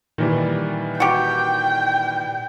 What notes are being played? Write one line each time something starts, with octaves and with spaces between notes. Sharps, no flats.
A#2 D#3 E3 G3
F#4 G4 G5